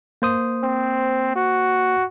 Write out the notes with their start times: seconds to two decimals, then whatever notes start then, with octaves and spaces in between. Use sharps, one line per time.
0.22 A#3 C5 D#6
0.64 C4
1.36 F#4